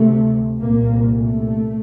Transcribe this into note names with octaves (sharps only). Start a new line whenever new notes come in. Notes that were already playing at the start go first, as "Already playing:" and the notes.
Already playing: D2 C3 A3
C2 A#2 A#3
A3